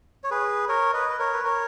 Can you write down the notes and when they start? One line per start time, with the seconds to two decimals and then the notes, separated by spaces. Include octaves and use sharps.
0.24 C#5
0.31 G#4 B4
0.69 A#4 C#5
0.94 B4 D#5
1.09 B4
1.19 A#4 C#5
1.33 B4
1.44 A#4 C#5